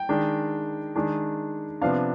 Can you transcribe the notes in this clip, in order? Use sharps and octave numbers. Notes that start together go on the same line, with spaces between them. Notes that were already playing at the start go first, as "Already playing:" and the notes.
Already playing: G5
D#3 G#3 D4
D#3 G#3 D4
C3 F3 B3 D4 F5